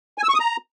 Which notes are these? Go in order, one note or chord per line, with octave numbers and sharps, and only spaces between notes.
G#5
E6
C#6
D#6
A#5